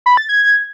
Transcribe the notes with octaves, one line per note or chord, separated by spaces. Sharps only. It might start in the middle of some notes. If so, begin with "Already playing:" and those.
B5
A6
G#6